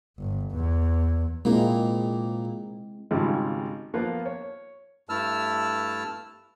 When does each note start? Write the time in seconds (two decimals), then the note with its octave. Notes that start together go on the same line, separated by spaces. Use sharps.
0.18 G1
0.52 E2
1.45 A#2 G#3 A#3 C4 E4
3.11 G#1 C#3 G3 G#3 F4
3.94 F3 A#3 B3 F4 B4
4.26 C#5
5.09 G2 A3 E4 A5 E6 F6